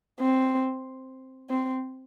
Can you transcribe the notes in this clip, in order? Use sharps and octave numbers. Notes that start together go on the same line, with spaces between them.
C4
C4